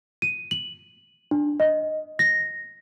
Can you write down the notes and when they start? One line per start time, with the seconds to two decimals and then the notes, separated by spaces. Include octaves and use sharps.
0.22 D#7
0.51 F#7
1.31 D4
1.60 D#5
2.19 A#6